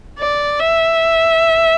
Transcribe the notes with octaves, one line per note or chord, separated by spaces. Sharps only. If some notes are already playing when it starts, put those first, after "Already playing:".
D5
E5